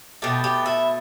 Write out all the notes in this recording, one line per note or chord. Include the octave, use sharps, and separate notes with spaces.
B2 A3 G4
G4
E4